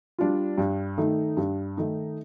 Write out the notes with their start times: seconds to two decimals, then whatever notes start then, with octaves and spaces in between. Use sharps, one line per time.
0.19 G3 D4 F4
0.58 G2
0.98 D#3 A3 D#4
1.37 G2
1.77 D#3 A3 D#4